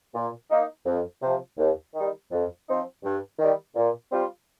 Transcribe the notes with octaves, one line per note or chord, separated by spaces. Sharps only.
A#2
A#3 D#4
F2
C3 F3
D#2
D#3 G3 D#4
F2
F3 C4 D#4
G2
D#3 G3
A#2
G3 C4 F4